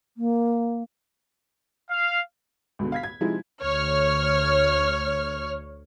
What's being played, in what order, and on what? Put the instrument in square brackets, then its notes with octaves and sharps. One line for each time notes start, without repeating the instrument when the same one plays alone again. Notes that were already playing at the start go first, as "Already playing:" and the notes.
[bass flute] A#3
[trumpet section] F5
[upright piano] C#2 B2 D3
F5 G#6 B6
G#6
C3 F3 G#3 D#4 E4 G#4
[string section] D2 C#5 F6